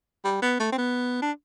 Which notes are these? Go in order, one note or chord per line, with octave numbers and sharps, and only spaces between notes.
G3
B3
A3
C4
B3
D4